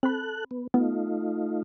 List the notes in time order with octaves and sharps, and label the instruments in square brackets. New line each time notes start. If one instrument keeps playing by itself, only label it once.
[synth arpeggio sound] C4 B5 [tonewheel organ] A4 F#6
[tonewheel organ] B3
[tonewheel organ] A3 D#4 F4 [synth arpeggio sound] B3